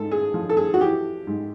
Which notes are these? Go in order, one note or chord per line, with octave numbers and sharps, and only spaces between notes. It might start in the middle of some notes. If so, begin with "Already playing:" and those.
Already playing: G#2 A4
G#4
F3
A4
G#4
F#4
E3 G4
G#2